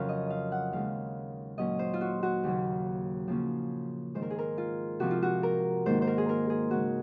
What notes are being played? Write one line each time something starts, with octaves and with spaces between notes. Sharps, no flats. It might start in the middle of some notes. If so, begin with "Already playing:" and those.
Already playing: F2 C#3 F#3 C#4 A#4 C#5 F5
D#5
F5
F#5
D#2 C#3 G#3 F5
A#2 F#3 C#4 D#5
C5
F4
F#4
F#4
D#2 C#3 F#3
C#3 F3 A#3 C#4
G#2 D#3 G#3 C5
A#4
G#4
A#4
F4
C3 F3 C4 F#4
F4
F#4
A#4
G#2 D#3 A#3 C5
C5
A#4
G#4
A#4
G#4
C#3 G#3 C4 F#4